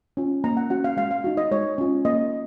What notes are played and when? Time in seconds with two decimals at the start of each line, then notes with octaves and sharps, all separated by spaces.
0.17 C#4 F4
0.44 A#3 A#5
0.57 F#5
0.70 C#4 F#4 F#5
0.84 F5
0.97 G#3 F5
1.11 F5
1.24 D#4 F#4
1.37 D#5
1.51 G#3 C#5
1.78 C#4 F4
2.05 A#3 D#5